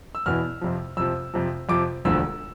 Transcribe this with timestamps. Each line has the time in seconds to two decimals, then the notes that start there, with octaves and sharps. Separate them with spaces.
0.15 E6
0.26 E2 B2 B3 E4 F6
0.61 F2 C3 F3
0.97 F2 C3 F3 E6
1.34 F2 C3 F3
1.69 F2 C3 F3 D6
2.05 E1 D2 D3 F3 E6